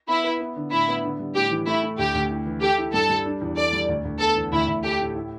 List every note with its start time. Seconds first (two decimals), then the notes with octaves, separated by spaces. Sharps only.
0.09 B3 E4
0.24 B4
0.40 B3
0.56 D3
0.72 A2 E4
0.88 B3
1.04 D3
1.20 G3
1.35 A2 G4
1.51 E3
1.67 A3 E4
1.83 A3
1.99 D2 G4
2.15 D2
2.30 E4
2.46 E3
2.61 G4 A4
2.78 E4
2.94 G2 A4
3.09 G3
3.26 D4
3.41 E2
3.57 A4 D5
3.73 G3
3.88 D2
4.04 D2
4.20 B3 A4
4.36 E2
4.52 D2 E4
4.68 D2
4.84 G4 A4
5.00 A2
5.15 E4